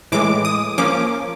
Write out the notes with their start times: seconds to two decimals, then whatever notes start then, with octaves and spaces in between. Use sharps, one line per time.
0.12 A2 E3 G#3 D6
0.45 D#6
0.78 F3 A#3 C#4 D6